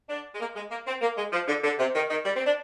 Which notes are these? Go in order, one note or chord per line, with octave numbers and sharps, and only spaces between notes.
D4
G#3
A#3
G#3
A#3
C4
A#3
G#3
F3
D3
D3
C3
D#3
D#3
G3
C4
D4